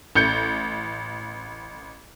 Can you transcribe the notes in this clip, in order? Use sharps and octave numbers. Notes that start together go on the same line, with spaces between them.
A1 G6 C#7